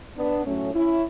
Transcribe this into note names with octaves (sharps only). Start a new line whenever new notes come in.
B3 D4
A2 F#3 A3 C#4
C#4 E4